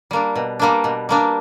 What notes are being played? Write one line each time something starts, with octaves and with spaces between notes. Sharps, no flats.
G3 A#3 D4
B2
G3 A#3 D4
B2
G3 A#3 D4